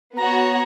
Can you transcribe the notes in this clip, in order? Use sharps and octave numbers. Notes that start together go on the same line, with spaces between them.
B3 F#4 C#5 A#5